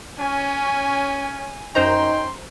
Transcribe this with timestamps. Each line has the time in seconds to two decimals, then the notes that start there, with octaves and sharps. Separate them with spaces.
0.19 C#4 G#5
1.75 F#2 C#4 D#4 C5 G5 A#5 C6